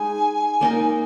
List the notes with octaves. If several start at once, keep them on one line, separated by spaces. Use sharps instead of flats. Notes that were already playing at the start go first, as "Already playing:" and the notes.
Already playing: G#3 D#4 G#4 G#5
A#3 D#4 A#4